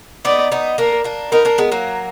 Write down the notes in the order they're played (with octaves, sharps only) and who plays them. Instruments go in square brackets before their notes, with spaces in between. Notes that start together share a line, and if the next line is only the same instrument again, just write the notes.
[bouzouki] B3 D#4 [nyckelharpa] D5
[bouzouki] B3 D#4
[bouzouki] A#3 D4 [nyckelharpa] A#4
[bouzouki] A#3 D4
[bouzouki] B3 D#4 [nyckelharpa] A#4
[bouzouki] A#3 D4
G#3 B3
F#3 A#3